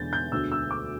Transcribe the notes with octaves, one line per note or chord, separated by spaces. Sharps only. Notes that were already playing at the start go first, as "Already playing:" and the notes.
Already playing: E1 E2 D3 G6 A6
G6
E1 D2 D3 E6
E6
D6